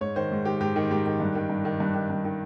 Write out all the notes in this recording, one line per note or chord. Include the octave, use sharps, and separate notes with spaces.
G#2 C#5
D#3 C5
G#2
D#3 G4
G#2 G4
D#3
G#2 G4
D#3
G2
D#3
G2
D#3
G2
D#3
G2
D#3